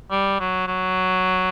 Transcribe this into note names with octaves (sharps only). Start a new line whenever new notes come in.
G3
F#3
F#3